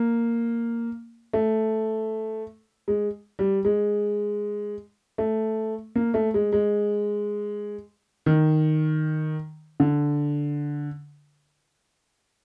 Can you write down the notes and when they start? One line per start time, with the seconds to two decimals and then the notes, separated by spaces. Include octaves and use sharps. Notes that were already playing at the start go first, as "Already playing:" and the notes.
Already playing: A#3
1.33 A3
2.88 G#3
3.39 G3
3.65 G#3
5.18 A3
5.96 A#3
6.14 A3
6.34 G#3
6.53 G#3
8.26 D#3
9.80 D3